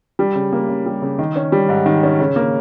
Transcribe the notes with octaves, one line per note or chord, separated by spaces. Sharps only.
G3
C#3
A#3
C#3
G3
C#3
D#3
C#4
G3
G#2
D#3
C#4
C#3
A#3